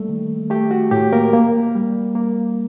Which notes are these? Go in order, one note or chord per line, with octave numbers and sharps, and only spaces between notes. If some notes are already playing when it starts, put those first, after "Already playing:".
Already playing: G3 A3 A#3 A4
D#3
A3 G4
F#4
A2 G4
A#3 A#4
A#3
G3
A#3